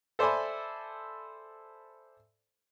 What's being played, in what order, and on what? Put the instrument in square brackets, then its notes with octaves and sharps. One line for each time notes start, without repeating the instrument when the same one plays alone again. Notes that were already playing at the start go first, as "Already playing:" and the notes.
[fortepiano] A4 C5 D5 E5 G#5 B5